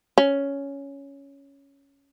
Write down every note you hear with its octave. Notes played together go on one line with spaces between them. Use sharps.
C#4